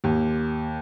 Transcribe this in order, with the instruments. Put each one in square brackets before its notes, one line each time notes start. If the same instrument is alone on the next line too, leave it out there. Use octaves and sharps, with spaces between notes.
[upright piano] D#2